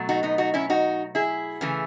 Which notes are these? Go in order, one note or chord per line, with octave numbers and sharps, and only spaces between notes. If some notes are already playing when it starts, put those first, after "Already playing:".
Already playing: B2 F#3 A3
D#4 F#4
B3 D#4
D#4 F#4
C#4 E4
D#4 F#4
E4 G#4
C#3 E3 A3